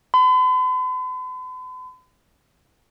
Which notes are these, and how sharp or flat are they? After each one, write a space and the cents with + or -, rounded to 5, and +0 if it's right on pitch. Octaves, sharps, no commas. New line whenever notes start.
B5 +45